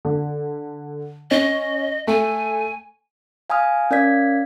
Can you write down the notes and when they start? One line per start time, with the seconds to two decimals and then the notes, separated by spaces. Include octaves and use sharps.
0.05 D3
1.31 C#4 D#5
2.07 A3 G#5
3.50 F5 G#5 A#5 D#6 F6
3.91 C#4 A#4 D5 F5 G#6 B6